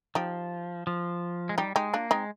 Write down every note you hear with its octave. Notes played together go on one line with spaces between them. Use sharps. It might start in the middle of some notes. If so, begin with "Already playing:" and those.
F3 D#4 G4
F3
G#3
G3 D#4 G4
G#3 D#4 G4
A#3 D4 F4
G#3 C4 D#4